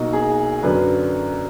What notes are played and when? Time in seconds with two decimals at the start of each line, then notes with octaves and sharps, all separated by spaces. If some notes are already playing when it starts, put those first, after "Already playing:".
Already playing: B1 B2 A#3 D#4 F#4 D#5
0.13 G#4
0.63 F#2 D3 F#3 D4 B4